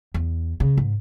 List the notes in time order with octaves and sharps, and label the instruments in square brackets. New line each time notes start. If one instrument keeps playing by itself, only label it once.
[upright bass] E2
C#3
G#2